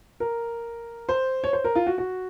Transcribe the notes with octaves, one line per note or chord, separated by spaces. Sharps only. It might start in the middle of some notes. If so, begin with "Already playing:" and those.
A#4
C5
C#5
C5
A#4
F4
F#4
F#4